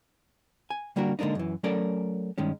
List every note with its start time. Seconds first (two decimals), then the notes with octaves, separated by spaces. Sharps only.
0.70 G#5
0.96 D3 G3 A#3 D4 F#4 A#4
1.19 D3 G#3 A#3 D4 D#4
1.35 F#2 E3
1.63 F#3 A3 C#4 A4 A#4 D5
2.38 G2 D#3 G#3 C#4